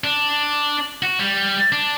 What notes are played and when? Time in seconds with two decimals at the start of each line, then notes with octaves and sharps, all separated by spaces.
0.04 D4
1.03 F#4
1.19 G3
1.72 D4